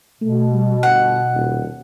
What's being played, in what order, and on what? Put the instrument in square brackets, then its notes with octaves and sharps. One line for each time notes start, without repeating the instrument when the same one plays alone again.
[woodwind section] B2 [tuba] A3
[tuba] G3
[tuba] G1 [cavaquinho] F#5
[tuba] D#1